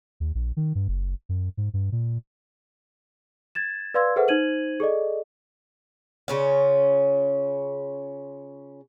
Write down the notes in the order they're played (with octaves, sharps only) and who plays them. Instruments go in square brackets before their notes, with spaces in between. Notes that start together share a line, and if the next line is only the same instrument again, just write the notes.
[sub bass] D#2
A#1
D#3
G2
F#1
F#2
G#2
G2
A#2
[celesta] G#6 A6 E7
B4 D5 F5 C6 E6 G#6
G#4 A4 B4 C5 E5 F#5
D#4 C5 G#6 D#7 F#7
G#4 A4 D5 D#5
[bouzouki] C#3 C#4 F4